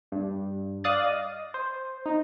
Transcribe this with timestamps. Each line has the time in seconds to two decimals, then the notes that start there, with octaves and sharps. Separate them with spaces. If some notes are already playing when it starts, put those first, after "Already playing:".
0.12 G2
0.84 D5 F5 D#6 F#6 A6
1.06 D#5
1.54 C5
2.06 D#4